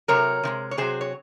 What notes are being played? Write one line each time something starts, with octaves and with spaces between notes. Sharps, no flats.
C3 F#3 A#4 C#5
C3 F3 G#3
C#5
C3 F#3 G#4 C5
C#5